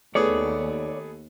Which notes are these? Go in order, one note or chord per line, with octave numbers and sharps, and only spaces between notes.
D#2 A3 B3 G#4 C#5 D5